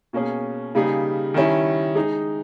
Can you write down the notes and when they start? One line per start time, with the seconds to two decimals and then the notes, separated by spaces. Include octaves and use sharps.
0.13 B2 A#3 C#4 G#4
0.75 C#3 G3 A#3 D#4 G#4
1.34 D#3 G3 C#4 E4
1.95 G#3 D#4 G#4